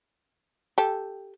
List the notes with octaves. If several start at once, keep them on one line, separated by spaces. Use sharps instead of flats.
G4 A4